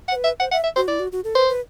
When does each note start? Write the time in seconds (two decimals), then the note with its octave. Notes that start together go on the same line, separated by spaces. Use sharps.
0.09 F#5
0.12 C5
0.16 B4
0.24 E5
0.40 C5 F#5
0.52 E5 F#5
0.64 E5
0.76 F#4 C5
0.88 E4 D5
1.00 F#4
1.12 F#4
1.24 A4
1.35 B4 C5
1.48 B4